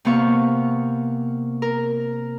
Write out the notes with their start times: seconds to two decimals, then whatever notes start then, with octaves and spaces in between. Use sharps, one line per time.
0.05 C3 A#3 B3 F5 C#6
1.62 A#4